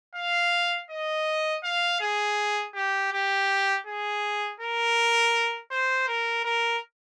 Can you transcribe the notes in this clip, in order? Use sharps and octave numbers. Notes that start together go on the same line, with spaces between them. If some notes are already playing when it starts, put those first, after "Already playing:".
F5
D#5
F5
G#4
G4
G4
G#4
A#4
C5
A#4
A#4